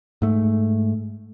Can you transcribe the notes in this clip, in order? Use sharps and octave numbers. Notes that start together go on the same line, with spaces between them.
G#2 A3